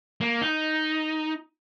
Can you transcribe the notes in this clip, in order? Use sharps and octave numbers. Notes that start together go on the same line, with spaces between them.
A#3
D#4